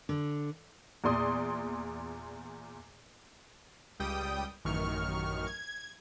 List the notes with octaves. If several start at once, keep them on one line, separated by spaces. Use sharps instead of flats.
D3
E2 A#2 D5 C6 D#6
C#2 G3 G5 D#6
A1 F#2 D#3 C#6 F6
G#6